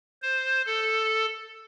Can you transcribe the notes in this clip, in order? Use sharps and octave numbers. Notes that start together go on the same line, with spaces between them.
C5
A4